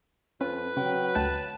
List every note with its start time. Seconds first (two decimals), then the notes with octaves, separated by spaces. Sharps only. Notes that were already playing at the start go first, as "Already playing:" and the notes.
0.41 F2 C#4 F4 B4
0.77 C#3 F#3 G5
1.15 D2 A3 G5 A5